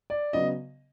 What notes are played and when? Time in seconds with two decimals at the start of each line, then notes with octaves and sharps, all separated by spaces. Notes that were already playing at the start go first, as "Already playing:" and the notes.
0.10 D5
0.33 C#3 F#3 B3 D#5